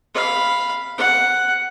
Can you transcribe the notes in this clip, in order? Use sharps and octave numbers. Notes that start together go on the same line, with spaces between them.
F5 B5
F#5